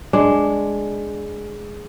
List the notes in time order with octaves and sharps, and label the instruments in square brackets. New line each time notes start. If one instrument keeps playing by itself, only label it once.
[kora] G#3 D4